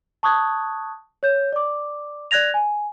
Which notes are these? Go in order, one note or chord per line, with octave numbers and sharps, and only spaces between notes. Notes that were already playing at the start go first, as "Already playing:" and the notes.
A5 C#6 D#6 F#6 G#6
C#5 G6
D5 D6
D5 F#6 G#6 A#6 F7
G#5